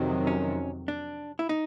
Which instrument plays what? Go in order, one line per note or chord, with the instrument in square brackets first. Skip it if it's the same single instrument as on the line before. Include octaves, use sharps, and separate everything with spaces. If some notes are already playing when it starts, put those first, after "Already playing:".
Already playing: [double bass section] F2 C3 D#3 F#3
[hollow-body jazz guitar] C#4
D4
E4
D#4